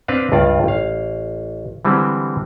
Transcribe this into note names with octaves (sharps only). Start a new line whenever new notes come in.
C4 D4 B4 F5
C#2 G2 F4 D5
A1 F5
D3 E3 G3 G#3 C4